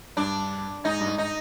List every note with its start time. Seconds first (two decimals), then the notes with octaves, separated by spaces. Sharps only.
0.17 G2 D4
0.84 G#2 D#4
1.01 G2
1.07 G#2
1.18 D#4